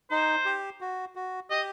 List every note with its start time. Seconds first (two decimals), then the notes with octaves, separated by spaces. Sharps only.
0.11 D#4 C5
0.45 G4
0.81 F#4
1.15 F#4
1.50 G4 D#5